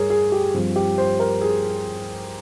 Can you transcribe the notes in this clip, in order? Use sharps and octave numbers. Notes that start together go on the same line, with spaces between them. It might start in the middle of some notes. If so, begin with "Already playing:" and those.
Already playing: G2 G#4 A#4 C#5
G#4
G4
G2 F3 C4
G4
C5
A#4
G#4